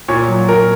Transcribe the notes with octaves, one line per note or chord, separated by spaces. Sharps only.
A#2 C#5
F#3
A#2 A#4